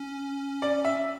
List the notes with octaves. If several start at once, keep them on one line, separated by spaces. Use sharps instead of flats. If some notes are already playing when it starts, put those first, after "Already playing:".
Already playing: C#4
D5
E5